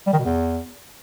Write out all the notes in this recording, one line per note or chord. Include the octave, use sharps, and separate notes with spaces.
G3
D#3
B2
E2